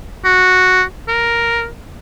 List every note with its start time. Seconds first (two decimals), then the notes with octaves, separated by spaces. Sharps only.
0.25 F#4
1.08 A#4